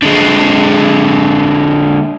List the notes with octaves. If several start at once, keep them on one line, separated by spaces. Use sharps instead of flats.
D3 G#3